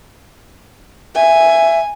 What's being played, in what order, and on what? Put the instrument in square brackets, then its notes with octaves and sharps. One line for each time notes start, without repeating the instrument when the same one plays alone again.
[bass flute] E5 [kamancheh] G#5